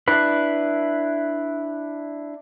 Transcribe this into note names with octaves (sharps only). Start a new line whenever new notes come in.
D4 E4 B4